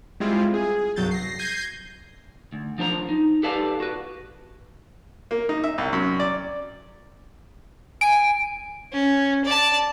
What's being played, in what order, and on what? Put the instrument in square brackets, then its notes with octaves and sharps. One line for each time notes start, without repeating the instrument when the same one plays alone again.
[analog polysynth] G3 G#3 C4 E4 F4
G#4
C2 G2 F#3 G6 A6
A#6 C7
G6 G#6 A#6 C7 D#7
[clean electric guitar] D2
F3 D4 C5 A#5
D#4
G4 A4 B4 D5 F5 A5
F#4 B4
[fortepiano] A#3
D#4
E5
C2
F#2
D5
[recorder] G#5 [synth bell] D7
[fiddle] C#4
D5 A5